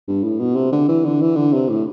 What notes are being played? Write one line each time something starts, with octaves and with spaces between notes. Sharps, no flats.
G2
A2
B2
C3
D3
E3
D3
E3
D3
C3
A2